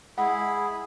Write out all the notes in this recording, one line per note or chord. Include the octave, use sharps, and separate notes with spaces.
G#3 E4 G#4 F#5 B5